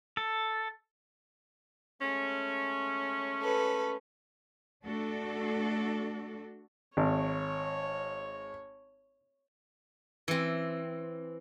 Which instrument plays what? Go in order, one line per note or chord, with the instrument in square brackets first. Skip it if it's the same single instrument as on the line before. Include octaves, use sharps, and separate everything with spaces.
[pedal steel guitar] A4
[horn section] G#3 A3 C#4
[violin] A4 B4
[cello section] A3 D4 F#4 A4
[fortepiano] G#1 [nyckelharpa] C#5
[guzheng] E3 C4